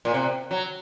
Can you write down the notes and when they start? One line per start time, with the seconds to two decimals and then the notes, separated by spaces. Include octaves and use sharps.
0.05 A#2
0.14 C3
0.51 F#3